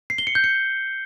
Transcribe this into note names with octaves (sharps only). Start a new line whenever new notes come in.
C7
G7
C#7
G6
C#7